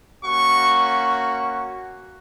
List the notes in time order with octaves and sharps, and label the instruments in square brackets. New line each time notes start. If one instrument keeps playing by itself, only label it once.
[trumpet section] A#3 C#4 F#4 C#6